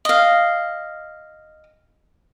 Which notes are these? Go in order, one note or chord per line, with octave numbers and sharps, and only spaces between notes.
D#5 F5